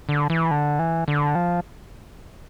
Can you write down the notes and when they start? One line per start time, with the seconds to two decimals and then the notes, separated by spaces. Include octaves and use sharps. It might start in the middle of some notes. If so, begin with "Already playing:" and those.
0.09 D3
0.30 E3
0.51 D3
0.79 E3
1.08 D3
1.35 F3